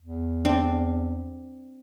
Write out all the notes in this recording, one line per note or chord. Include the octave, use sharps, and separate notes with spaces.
E2
C4 D4